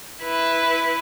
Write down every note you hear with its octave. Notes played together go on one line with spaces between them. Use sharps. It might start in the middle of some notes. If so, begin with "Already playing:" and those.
E4 B4